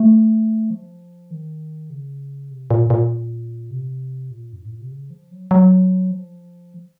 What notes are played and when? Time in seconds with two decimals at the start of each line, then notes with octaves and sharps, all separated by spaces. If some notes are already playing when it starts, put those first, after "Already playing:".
Already playing: A3
0.70 F3
1.31 D#3
1.90 C#3
2.51 C3
2.70 A#2
2.90 A#2
3.71 C3
4.31 A#2
4.53 F#2
4.62 A2
4.72 A#2
4.81 C3
4.91 C#3
5.10 F3
5.31 F#3
5.51 F#3
6.11 F3